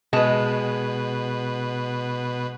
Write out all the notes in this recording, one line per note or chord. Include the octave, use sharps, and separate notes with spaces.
B2 G#3 B4 A5